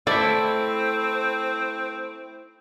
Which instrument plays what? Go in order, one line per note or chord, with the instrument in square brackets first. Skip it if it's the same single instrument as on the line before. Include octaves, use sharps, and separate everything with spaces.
[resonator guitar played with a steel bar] A3 [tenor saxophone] C4 [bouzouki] E4 [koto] D5 E5